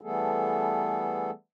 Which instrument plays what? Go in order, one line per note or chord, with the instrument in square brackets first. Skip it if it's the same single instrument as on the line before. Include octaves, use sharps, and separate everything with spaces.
[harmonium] E3 G3 A3 B3 G#4 A4